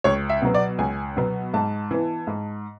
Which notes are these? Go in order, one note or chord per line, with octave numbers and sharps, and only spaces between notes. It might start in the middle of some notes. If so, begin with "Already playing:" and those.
C#2 C#5
E5
B2 F#3 B3
D5
C#2 G#5
B2 F#3 B3
G#2 A5
E3 B3
G#2